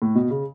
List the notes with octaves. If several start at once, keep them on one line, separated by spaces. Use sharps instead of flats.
A2
B2
C#3